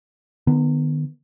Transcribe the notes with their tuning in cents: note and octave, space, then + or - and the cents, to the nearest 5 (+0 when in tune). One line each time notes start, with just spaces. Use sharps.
D#3 -40 B3 +0